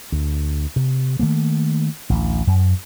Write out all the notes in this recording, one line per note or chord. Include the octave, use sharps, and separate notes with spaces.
D2
C3
D#3 A3 A#3
A1 D2
F#2